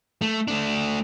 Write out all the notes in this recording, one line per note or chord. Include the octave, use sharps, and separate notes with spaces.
A3
A3 D4